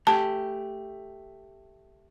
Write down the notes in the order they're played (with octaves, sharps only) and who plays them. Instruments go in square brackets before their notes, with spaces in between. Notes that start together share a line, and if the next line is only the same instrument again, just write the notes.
[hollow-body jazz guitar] A3 G4 [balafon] A5